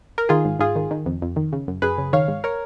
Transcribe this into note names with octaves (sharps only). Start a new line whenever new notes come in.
A#4
D#3 F4 G#4
G#2
G#2 F4 G#4
D#3
D#3
F2
F2
D#3
C#3
F#2
F#2 G#4 B4
C#3
D#3 C#5 F5
G#2
A#4 C#5